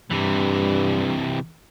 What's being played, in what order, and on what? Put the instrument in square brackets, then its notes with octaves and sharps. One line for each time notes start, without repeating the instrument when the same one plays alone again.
[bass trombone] G2 [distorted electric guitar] C3 E3